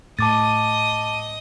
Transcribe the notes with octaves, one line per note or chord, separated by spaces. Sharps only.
A2 D#5 A5 D6 D#6 A6